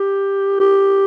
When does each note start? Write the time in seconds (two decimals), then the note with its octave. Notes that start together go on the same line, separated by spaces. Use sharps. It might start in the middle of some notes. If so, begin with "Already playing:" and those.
Already playing: G4
0.60 G4